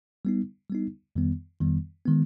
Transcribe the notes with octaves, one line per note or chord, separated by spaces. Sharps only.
G3 B3 D#4
G3 B3 D#4
F2 D#3 G3 B3
F2 D#3 G3 B3
D#3 G#3 B3